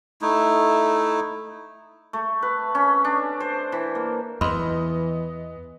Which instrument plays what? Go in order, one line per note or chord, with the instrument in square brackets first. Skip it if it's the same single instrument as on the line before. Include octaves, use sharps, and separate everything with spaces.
[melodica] A3 D#4 E4
[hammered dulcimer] A3
B4
C#4
D4
C5
E3
A#3
[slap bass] E2 [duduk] E3 [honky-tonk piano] B3 D#5 [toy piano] B5 C6